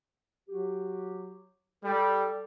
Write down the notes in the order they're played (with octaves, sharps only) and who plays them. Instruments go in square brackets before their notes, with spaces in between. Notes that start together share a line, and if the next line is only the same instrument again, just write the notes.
[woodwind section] F#3 F#4 G4
[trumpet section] G3 [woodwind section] A4